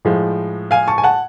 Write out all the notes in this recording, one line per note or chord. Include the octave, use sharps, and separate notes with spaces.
A2 F3 G#3
F5 G#5
A5 C#6
G#5
F#5 A5